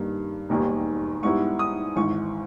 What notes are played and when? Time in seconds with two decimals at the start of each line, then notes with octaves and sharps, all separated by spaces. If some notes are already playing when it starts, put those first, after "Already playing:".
Already playing: G2 D#3 A#3
0.49 E1 D#2 D#3 G3 A#3
1.23 G#2 G3 B3 E4 C#6
1.59 D#6
1.96 G#1 G#2 E3 C#6